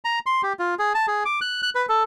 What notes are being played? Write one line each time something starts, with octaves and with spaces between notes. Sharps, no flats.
A#5
C6
G4
F4
G#4
A5
G#4
D6
F#6
F#6
B4
A4